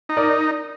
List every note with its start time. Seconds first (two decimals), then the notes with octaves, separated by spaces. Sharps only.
0.09 D#4
0.17 A#4 D5